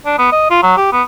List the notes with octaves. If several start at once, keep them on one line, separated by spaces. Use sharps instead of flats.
D4
B3
D#5
F4
F#3
G4
B3